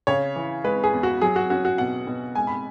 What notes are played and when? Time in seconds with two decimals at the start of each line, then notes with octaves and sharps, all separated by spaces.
0.07 C#3 C#5
0.36 E3
0.64 G#3 B4
0.84 G#4
0.93 E2
1.03 F#4
1.21 F#3 G#4
1.36 F#4
1.50 C#4 F#4
1.65 F#4
1.78 B2 F#5
2.07 B2
2.35 G#3 G#5
2.47 B5